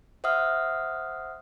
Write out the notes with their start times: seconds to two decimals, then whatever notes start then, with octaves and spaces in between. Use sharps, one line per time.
0.24 C5 E5 F#5 D#6 F6